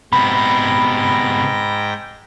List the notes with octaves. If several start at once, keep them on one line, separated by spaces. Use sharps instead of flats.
G#2 C3 B3 G5 B5 A#6